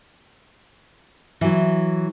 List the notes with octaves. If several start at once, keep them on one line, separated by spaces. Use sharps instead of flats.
E3 F#3